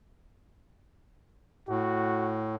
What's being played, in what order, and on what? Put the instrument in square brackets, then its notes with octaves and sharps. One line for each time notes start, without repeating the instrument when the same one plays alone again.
[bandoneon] A2 [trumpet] F#4